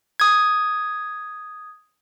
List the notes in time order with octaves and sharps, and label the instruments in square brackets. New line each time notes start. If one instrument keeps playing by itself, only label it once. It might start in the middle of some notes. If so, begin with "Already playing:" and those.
[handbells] D#6 G#6